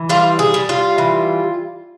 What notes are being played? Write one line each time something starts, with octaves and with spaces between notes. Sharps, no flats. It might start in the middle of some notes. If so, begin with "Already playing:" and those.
Already playing: E3
G3 F4
G#4
G3
F4
E3